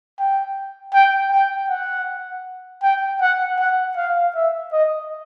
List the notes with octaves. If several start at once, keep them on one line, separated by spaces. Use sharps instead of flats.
G5
G5
G5
F#5
G5
F#5
F#5
F5
E5
D#5